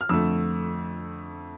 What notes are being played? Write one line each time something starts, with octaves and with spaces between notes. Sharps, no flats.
F6
F2 D3 A3 E6